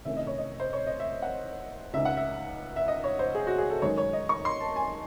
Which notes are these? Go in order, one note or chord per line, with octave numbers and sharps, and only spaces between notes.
C2 C3 D#3 A3 C#4 E5
D#5
C#5
D#5
C5
C#5
D#5
E5
F#5
C#2 C#3 G#3 D#4 E5
F#5
E5
E5
D#5
C#5
C5
G#4
F#4
G#4
A4
F#2 D#3 G#3 D#4 C#5
C#5
D#5
C#6
C6
A5
G#5